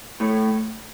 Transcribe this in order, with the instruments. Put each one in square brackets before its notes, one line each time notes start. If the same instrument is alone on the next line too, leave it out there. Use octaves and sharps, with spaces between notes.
[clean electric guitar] A2 A3